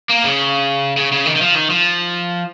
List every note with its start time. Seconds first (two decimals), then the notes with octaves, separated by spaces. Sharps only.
0.09 A#3
0.24 C#3
0.97 C#3
1.12 C#3
1.26 D#3
1.36 D#3
1.41 F3
1.55 D#3
1.70 F3